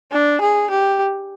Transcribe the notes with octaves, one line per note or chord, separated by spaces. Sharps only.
D4
G#4
G4